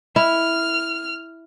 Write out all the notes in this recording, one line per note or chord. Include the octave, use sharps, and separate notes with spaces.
E4 F6